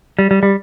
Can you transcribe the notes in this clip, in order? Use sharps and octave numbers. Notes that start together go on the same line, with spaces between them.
G3
G3
G3